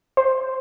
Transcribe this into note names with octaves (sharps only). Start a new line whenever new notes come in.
C5